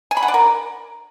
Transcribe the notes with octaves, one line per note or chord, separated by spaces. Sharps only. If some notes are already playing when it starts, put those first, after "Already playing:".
G#5
B5
F#5
D5
A#4